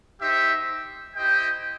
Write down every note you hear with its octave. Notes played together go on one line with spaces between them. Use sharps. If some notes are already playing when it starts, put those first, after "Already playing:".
D#4 G4 C5 E5
E4 G4 C5 D#5 G5